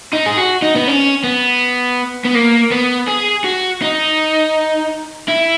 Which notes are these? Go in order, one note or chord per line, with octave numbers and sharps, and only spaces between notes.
D#4
G#4
F#4
D#4
B3
C#4
B3
B3
A#3
B3
G#4
F#4
D#4
E4